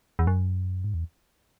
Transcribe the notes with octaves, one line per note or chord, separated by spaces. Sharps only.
E2
F#2
G#2
E2